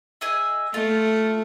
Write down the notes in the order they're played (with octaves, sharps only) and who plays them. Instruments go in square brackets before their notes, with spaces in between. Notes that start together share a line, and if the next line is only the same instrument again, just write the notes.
[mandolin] G#4 D#5 E5
[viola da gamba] A3 [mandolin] F4